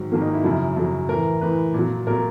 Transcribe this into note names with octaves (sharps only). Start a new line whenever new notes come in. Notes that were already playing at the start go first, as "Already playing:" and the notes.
Already playing: G#2 D#3 F#3
G#2 D#3 F#3 A#3
D#4
E4
F#2 C#3 F#3 E4
F#2 C#3 F#3
A2 E3 A#4
A2 E3 B4
A#2 F#3
A#2 F#3 A#4